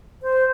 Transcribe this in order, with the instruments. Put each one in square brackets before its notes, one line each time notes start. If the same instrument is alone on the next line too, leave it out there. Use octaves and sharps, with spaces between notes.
[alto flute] C5